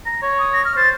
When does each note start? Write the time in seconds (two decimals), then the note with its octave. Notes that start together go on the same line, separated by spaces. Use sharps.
0.06 A#5
0.23 C#5
0.39 D#6
0.53 A#6
0.65 F6
0.77 C5 A6